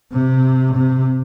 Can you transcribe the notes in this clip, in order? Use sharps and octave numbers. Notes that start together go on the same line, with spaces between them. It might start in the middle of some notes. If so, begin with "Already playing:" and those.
C3
C3